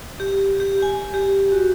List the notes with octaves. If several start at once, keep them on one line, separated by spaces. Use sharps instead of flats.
G4
G4
G#5
G4
F#4